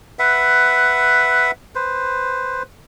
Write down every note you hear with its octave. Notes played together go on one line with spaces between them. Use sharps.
B4 E5 F#5
B4 C5